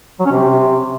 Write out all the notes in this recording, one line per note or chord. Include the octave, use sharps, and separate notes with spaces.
F#3
C#4
C3